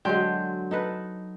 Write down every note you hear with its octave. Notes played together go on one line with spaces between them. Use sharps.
D3 F#3 G#3 G5 C6
D#4 A4 B4